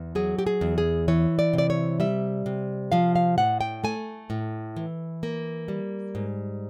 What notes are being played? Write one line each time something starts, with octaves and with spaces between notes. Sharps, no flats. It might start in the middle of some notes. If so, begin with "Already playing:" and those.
Already playing: E2
F#3 G#4
G4
G#4
E2
G#4
E3 C#5
D5
C3
D5
C#5
G3 E5
C3
F3 F5
F5
A2 F#5
G5
A3 G#5
A2
E3
A#3
G3
G#2